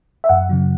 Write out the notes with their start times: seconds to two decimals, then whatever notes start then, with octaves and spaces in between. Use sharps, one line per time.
0.24 E5
0.29 F#2 F#5
0.49 C#3 F#3